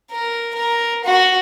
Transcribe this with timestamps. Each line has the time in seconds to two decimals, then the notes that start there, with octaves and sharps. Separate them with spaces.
0.11 A#4
0.55 A#4
1.05 F#4